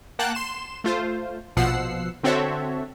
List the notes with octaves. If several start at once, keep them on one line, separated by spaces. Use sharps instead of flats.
A#3 F#5 G5 A5 F#6
C6 E7
A3 F4 C5
A#1 B2 F3 F#5 E6 C7
D3 C4 F#4 A4 C#5 E5